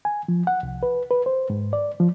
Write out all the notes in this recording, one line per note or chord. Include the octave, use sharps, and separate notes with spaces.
G#5
F3
F#5
C2
B4
B4
C5
G#2
D5
F3